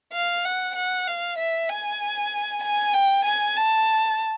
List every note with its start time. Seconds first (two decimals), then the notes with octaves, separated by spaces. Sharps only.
0.13 F5
0.45 F#5
0.76 F#5
1.07 F5
1.39 E5
1.69 G#5
2.63 G#5
2.94 G5
3.25 G#5
3.56 A5